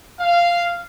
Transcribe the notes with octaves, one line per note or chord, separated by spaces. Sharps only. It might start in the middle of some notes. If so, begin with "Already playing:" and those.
F5